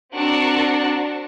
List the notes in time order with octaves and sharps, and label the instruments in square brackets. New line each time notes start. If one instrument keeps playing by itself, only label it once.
[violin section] C4 D4 F#4 A#4 F#5 A5